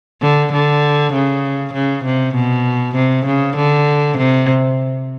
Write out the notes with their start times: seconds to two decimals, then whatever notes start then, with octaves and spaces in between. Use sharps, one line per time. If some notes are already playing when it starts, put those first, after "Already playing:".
0.21 D3
0.52 D3
1.13 C#3
1.73 C#3
2.04 C3
2.35 B2
2.95 C3
3.26 C#3
3.56 D3
4.17 C3